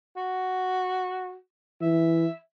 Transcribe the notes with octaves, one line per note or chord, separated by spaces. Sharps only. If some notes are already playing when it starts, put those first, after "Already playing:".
F#4
E3 E5